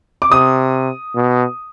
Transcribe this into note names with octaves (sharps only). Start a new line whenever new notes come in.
D6
C3 D#6
B2